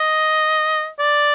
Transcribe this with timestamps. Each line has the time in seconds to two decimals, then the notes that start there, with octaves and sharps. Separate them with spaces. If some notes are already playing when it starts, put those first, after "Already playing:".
Already playing: D#5
0.99 D5